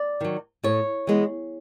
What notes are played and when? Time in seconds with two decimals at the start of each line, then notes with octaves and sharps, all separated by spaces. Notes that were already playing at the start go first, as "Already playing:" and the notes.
Already playing: D5
0.21 D#3 F#3
0.63 A2 C#5
1.07 E3 G#3 B3